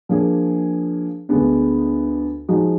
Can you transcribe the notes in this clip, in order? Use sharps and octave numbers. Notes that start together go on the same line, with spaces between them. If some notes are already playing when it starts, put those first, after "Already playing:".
F3 A#3 D4 G#4
D2 D3 G#3 B3 D4
F3 G#3 D#4 F#4